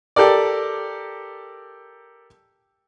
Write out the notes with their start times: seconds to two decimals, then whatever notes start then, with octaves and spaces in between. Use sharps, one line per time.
0.16 G4 A4 A#4 D5